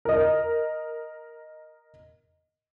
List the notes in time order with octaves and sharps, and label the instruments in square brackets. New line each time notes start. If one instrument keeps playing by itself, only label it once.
[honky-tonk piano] A#4 D#5